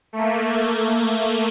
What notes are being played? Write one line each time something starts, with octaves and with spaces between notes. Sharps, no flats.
A3 A#3